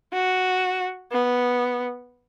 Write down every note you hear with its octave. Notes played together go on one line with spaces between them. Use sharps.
F#4
B3